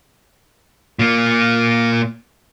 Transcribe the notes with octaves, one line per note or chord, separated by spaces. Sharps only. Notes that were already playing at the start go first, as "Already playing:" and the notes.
A#2 A#3